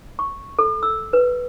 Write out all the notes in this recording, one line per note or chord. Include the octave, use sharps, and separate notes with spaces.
C#6
A4
E6
B4